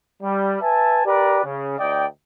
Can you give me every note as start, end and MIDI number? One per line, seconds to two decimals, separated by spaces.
0.23 0.56 55
0.61 1.02 71
0.61 1.02 76
0.61 1.02 80
0.61 1.02 81
1.05 1.41 67
1.05 1.41 70
1.05 1.41 71
1.05 1.41 74
1.45 1.78 49
1.78 2.06 38
1.78 2.06 74
1.78 2.06 75
1.78 2.06 79